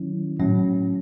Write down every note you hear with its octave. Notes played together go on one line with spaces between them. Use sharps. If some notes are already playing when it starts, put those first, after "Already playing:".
Already playing: D#3 F#3 C#4 E4
A2 F#3 C#4